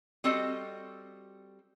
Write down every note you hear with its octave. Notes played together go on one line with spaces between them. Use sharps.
G3 C4 F#4 A4 D#5